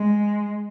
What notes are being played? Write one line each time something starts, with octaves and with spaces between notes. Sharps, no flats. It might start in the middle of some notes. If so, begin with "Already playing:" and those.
Already playing: G#3